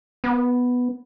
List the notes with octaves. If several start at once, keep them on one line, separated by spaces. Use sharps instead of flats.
B3